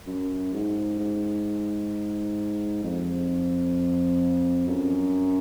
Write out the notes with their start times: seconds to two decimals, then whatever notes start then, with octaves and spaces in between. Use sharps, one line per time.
0.07 F#2
0.53 G#2
0.99 G#2
2.84 F2
4.68 F#2